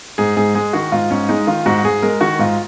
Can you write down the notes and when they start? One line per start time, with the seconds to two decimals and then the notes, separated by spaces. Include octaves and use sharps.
0.18 G#2 G#4
0.37 G#2 G#4
0.55 G#3 G#4
0.73 D#3 F#4
0.92 G#2 F4
1.10 G#2 C#4
1.29 G#3 D#4
1.47 D#3 F4
1.66 G#2 F#4
1.84 G#2 G#4
2.02 G#3 A#4
2.21 D#3 F#4
2.39 G#2 F4